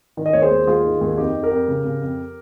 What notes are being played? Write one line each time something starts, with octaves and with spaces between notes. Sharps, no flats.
D#3
D#5
D#2 C#5
G#4 C5
D#2
D#2 F4 G#4
D#3
D#2
F2 D#4 G4
F2
G4 A#4
F2
C#3
C#3
F2